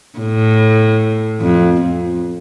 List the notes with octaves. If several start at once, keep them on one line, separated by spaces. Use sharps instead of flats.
A2
F2
F2